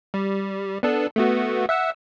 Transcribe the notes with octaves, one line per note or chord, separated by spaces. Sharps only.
G3
B3 D4 A4
A3 B3 F#4
E5 F#5 E6